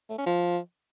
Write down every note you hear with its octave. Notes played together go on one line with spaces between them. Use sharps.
A3
C#4
F3